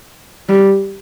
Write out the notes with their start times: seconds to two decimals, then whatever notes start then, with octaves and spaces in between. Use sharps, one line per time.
0.49 G3